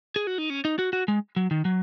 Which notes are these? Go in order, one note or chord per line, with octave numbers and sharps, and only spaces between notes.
G#4
F#4
D#4
C#4
D#4
F#4
F#4
G#3
F#3
D#3
F#3